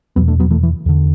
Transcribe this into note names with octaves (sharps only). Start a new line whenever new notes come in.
E2 B2 F#3 B3
A3 D4
F#3 B3
E3 A3
E3
E2 D3